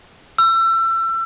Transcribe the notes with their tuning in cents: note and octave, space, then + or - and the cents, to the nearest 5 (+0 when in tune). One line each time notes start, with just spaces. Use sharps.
E6 +30